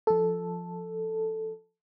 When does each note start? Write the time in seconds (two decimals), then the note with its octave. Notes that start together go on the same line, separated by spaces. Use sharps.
0.07 F3 A4